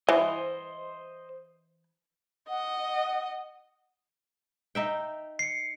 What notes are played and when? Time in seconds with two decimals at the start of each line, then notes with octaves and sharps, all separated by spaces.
0.09 E3 C5 D#5
2.49 D#5 F#5
4.75 D#4 E5 G5
5.39 C7 C#7